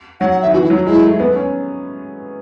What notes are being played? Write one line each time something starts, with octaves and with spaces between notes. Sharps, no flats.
F#3 F#5
F#5
D#3 E5
E3 F#4
E4
F#3
F#4
G#3 E4
A3
B3
C#4